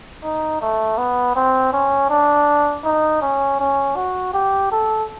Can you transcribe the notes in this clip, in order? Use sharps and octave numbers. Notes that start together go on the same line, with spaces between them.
D#4
A3
B3
C4
C#4
D4
D#4
C#4
C#4
F#4
G4
A4